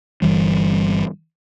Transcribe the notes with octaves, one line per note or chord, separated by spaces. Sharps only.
G1 D#2 E3 G3